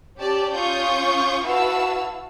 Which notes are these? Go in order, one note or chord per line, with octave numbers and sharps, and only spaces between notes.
C#4 G4 D5 A5
C#4 F4 C#6 D#6 G6
E4 F#4 B4 F5 A5 E6